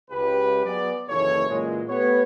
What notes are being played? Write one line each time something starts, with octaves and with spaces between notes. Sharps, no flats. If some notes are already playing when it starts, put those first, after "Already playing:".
C#2 G4 B4
F#3 B3 G#4 D5
F#1 D#2 E3 A4 C#5
A#2 C#3 E3 F#3 G#3
A3 B3 G4 B4 C#5